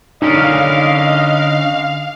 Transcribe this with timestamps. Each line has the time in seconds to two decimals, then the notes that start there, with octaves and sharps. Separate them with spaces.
0.22 D3 C#4 D#4 A#4 D#5 F5